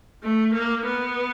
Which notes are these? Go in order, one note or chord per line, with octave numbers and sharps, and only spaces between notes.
A3
A#3
B3